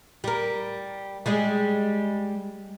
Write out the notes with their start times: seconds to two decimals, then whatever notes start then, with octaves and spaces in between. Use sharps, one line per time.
0.24 G3 A#4
1.26 G3 G#3 G#4